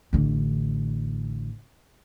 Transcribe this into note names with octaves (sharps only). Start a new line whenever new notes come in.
A1 D3